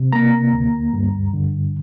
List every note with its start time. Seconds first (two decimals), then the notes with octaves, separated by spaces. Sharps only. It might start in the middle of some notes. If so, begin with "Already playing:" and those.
Already playing: C3
0.13 A#3 A#5
0.53 D2
0.93 G2
1.33 D3